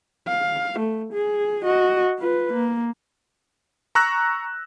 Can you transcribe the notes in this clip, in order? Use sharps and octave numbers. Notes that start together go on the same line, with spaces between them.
F5
A3
G#4
F#4 D#5
F4 B4
A#3
A#5 C#6 E6 F#6 A#6